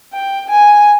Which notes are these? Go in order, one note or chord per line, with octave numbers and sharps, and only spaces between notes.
G5
G#5